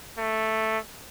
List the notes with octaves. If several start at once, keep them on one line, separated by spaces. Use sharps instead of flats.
A3